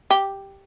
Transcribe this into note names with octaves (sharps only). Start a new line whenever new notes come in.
G4